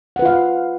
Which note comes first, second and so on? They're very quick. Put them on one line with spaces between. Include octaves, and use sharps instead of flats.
F#5 B4 F4 F5